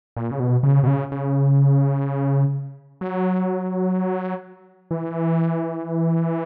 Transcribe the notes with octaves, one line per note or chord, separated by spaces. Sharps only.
A#2
C#3
B2
C#3
B2
C#3
C#3
F#3
E3